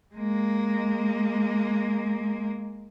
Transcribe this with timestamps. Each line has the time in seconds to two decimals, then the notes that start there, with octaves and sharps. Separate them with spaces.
0.15 G#3 A#3